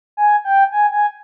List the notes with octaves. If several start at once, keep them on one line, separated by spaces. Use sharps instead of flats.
G#5
G5
G#5
G#5